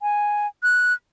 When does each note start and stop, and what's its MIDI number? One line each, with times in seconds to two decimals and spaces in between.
0.02 0.47 80
0.63 0.93 90